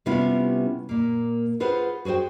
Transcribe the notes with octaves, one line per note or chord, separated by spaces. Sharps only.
C3 G3 B3 C#4 E4 F4
A#2 A#3
F4 G#4 B4 C5 F#5
F#4 G#4 A#4 C5 G5